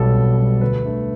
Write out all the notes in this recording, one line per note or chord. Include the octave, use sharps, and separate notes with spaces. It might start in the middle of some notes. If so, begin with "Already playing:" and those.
Already playing: B1 B2 G3 A4
B1
B2 G3
D2 B4
D3 A3